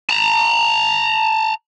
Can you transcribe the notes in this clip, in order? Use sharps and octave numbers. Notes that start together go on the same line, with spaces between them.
A5 A#5